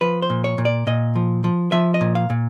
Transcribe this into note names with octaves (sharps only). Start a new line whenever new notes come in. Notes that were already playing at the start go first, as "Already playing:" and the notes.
F3 B4
C5
A#2
C#5
A#2
D5
A#2 D#5
F3
F3
F3 E5
D#5
A#2
F5
A#2